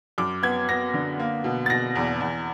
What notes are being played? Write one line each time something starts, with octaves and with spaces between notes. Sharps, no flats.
F#2 D6
B3 G#6
B3 A#6
D3
A#3
B2
A6
B2 A#6
E2
E2